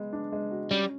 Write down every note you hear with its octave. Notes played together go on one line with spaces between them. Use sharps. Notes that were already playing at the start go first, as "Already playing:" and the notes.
Already playing: G#3 B3
D4
G#3
F#4
G3 C#4